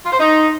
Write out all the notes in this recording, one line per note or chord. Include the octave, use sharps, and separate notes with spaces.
F4
C5
D#4